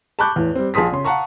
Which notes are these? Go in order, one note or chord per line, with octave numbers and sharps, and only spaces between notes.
A5 B5 C#6 D6 F#6 G6
E2 A2
G3 C4
A#1 G#4 A5 C6 D#6 B6
C#3 C6
F5 F#5 A5 A#5 C#6